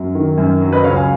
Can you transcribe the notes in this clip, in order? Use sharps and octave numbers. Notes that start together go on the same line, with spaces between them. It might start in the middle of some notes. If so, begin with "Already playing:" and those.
Already playing: F#2 F#3
D#3
F#2
F#3
B4 D#5
C#2 C#5 F5
F5 G#5